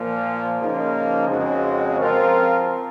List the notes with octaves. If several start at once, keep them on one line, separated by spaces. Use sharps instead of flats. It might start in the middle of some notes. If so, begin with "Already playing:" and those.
Already playing: A#2 F3 A#3
C#3 F3 A#3 D#4
F2 C#3 G#3 C4 F#4
F3 C4 F4 A#4